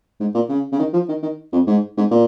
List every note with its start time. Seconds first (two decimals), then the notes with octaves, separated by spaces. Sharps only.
0.20 G#2
0.35 A#2
0.49 C#3
0.72 C#3
0.79 D#3
0.93 F3
1.08 D#3
1.23 D#3
1.53 F2
1.67 G#2
1.97 G#2
2.11 A#2